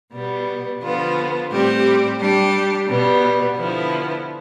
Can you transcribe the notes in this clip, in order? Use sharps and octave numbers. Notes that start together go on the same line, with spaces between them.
B2 G3 B3
D3 F3 B3 F4
A2 G3 C4 G4
G3 D4 G4
B2 G3 B3
D3 F3 B3 E4